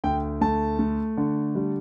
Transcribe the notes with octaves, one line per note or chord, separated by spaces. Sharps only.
D2 G5
A3 A5
A3
D3
G3